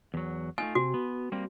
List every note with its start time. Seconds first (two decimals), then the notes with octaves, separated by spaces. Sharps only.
0.14 E2 F#3
0.58 A3 D#4 F4 G#5
0.75 C3 F#4
0.94 B3
1.32 G3 A#3 C4